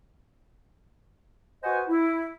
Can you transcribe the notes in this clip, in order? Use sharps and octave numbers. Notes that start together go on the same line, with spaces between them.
F#4 B4 C5 D#5 F#5 G#5
E4